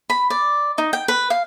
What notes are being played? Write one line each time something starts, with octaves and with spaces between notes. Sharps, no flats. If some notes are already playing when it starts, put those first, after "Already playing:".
B5
D5
D#4
G5
B4
F5